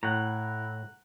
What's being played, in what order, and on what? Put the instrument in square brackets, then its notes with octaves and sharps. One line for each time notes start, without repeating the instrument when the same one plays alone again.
[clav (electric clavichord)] A2 [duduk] E4 [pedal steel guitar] F#5 A#5